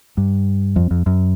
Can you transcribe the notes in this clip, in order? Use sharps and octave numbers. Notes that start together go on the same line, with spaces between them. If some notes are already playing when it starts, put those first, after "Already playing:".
G2
F2
F2
F#2